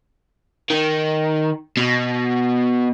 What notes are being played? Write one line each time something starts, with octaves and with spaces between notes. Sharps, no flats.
D#3
B2